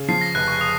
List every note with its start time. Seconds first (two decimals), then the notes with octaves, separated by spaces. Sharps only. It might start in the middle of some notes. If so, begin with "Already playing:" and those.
Already playing: C#3
0.08 F3 C7
0.21 A#6
0.35 F1 F#6
0.48 C#6
0.61 D#6